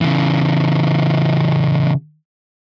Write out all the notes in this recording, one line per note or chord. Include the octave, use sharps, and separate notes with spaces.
C#3 E3